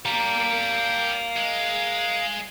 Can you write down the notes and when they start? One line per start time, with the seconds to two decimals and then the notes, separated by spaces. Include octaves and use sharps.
0.06 G3 D4 F5 A#5
1.37 G#3